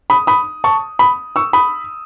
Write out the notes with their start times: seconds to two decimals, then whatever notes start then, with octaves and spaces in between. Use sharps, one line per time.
0.10 B5 D#6
0.27 B5 D#6
0.64 A5 C#6
0.99 B5 D#6
1.36 C#6 E6
1.53 B5 D#6